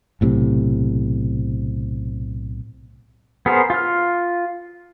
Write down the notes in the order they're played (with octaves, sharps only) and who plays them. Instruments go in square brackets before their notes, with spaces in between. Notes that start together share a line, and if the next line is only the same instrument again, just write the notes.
[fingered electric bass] B1 A2 C3
[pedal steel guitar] B3 G#4 A#4 C5
F4 F6